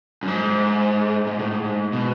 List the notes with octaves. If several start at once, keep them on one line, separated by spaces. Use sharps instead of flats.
F#2
G#2
G#2
A2
G#2
B2